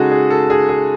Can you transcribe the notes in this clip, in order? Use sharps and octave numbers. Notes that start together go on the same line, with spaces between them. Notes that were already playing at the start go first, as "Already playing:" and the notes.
Already playing: C#3 G#3 D#4 F#4 G#4 A4
G#4
A4
G#4
G#4